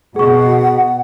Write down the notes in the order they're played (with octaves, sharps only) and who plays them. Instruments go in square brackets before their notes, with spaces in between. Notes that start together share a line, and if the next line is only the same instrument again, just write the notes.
[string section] B2 [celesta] G#4 C#6 [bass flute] F#5